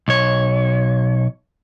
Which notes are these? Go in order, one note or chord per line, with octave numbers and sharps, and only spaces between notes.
B1 C#5